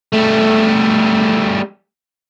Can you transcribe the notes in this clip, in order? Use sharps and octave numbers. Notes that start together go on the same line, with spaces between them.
G3 A3